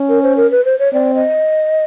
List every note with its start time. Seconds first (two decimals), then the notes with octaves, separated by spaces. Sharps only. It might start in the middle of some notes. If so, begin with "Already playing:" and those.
Already playing: C#4
0.09 A#4
0.23 C5
0.37 A#4
0.51 B4
0.65 C5
0.79 C#5
0.93 C4 D5
1.14 D#5